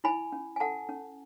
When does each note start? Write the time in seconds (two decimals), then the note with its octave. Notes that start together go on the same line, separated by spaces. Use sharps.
0.04 E4 G#5 B5
0.32 C#4
0.56 G#5
0.60 A4 F#5 A5
0.89 C#4